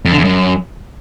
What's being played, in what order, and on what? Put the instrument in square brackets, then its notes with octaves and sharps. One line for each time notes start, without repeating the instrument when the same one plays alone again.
[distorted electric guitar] F2
D3
E2
F#2